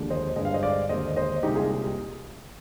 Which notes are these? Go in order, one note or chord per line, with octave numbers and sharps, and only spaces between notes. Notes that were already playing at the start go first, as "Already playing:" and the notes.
Already playing: D#2 D3 F3 G#3
C5 D#5
G2 D3 G#3 D#5
F5
C5 D#5
D5 F5
D#2 D3 G#3 C5 D#5
C5 D#5
C2 A#2 G#3 D#4 G4
F4 G#4